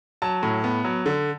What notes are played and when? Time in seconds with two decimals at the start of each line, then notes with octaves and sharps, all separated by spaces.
0.22 F#3 A5
0.43 A2
0.64 B3
0.84 F#3
1.06 D3